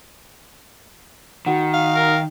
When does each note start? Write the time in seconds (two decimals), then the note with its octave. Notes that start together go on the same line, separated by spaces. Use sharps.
1.46 D#3 F#4 F#5
1.74 F5
1.95 A#4